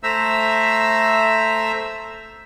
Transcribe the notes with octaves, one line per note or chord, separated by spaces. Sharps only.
A3 C5 E5 A#5 E6